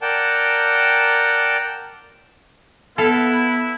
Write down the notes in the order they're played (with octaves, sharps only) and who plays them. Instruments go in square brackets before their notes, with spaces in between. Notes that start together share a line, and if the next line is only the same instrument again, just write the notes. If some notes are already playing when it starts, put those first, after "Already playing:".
[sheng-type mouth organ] A#4 D5 F#5 G5 A5
[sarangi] B3 [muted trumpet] E4 [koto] A4 F5